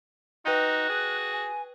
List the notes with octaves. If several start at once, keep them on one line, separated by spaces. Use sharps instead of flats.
D#4 F#4 B4 G5 F#6 D#7
G#4
G#5